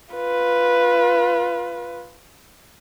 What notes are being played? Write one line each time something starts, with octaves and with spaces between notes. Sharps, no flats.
F4 B4